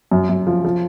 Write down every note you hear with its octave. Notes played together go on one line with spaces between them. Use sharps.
F#2
F#2
F3
F3